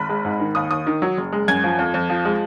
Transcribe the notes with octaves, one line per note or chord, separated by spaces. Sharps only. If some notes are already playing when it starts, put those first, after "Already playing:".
Already playing: G#1 B5
G#3
G#2
D#3
D#2 D#6
D#2 D#6
D#3
F#3
F#1
G#3
F#2 G#6
F3
F2
F2
F3
G#3